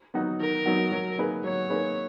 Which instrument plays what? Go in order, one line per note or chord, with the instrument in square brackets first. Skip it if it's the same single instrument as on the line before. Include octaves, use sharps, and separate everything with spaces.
[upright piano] F#3 B3 D#4 F#4
[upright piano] D#3 [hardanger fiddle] A#4
[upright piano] F#3 B3 D#4 F#4
F#3
A#3 D#4 G#4 B4
[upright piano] F#3 [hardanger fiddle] C#5
[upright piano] A#3 D#4 G#4 B4